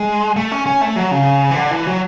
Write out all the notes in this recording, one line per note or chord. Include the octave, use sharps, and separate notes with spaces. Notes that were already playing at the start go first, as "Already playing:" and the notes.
Already playing: G#3
A3
C#4
C#4
A3
F#3
C#3
E3
D3
E3
F#3